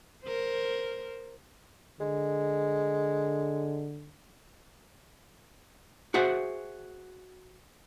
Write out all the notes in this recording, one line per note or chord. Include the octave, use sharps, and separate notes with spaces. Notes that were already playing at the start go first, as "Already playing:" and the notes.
A#4 C5
D3 G#3
F#4 G#4 C5 E5 F#5